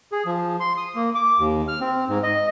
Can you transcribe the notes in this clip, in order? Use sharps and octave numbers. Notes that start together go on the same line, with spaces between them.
G#4
F3
C6
D#6
A#3
D6
D#2
F6
C4
G#2
D#5